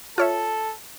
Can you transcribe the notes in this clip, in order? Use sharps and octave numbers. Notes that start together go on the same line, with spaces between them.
F4 A4 C#5 E5